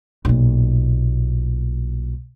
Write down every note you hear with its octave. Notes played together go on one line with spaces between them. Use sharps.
B1 A#2